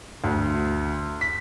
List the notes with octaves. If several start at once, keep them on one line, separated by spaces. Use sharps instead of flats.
D2
B6